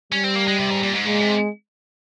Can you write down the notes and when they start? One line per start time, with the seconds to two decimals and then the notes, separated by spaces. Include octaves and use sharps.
0.12 G3 C#4
0.24 C4
0.36 A#3
0.48 G#3
0.59 C3
0.71 G#2
0.83 A#2
0.95 G#2
1.06 A#2 G#3
1.22 C3